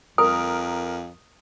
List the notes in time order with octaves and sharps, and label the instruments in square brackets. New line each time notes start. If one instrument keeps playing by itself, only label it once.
[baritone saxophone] F2 [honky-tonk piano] A#4 [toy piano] D#6